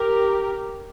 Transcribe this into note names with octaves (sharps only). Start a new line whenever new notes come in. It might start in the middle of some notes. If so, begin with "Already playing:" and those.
Already playing: G4 A#4